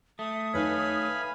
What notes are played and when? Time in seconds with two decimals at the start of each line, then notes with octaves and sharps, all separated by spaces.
0.19 A3 D#6
0.54 D#4 B4 C#5 F5 G#5 B5